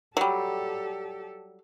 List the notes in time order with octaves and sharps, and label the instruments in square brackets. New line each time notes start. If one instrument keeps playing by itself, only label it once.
[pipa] F#3 G3 [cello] G4 A4